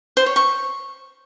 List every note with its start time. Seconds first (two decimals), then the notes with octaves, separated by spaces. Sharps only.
0.17 C5
0.26 C#5
0.36 C#6